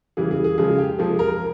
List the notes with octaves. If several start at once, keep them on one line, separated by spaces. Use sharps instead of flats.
C#3 E3 G3 G#4
G#4
G#4
C#3 F3 G#3 G#4
G4
C3 F3 G#3 G#4
A#4